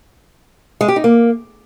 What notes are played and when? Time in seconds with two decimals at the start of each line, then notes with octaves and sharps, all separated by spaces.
0.81 G#3
0.88 G4
0.96 D#4
1.04 A#3